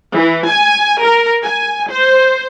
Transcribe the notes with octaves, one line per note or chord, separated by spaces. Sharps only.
E3
G#5
A#4
G#5
C5